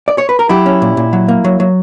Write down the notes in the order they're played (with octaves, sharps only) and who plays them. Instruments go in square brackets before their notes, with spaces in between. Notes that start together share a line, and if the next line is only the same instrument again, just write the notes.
[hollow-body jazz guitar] D5
C#5
B4
A#4
F#3 E4 G4
C#4
A#2
A#2
F#3
A#3
F#3
F#3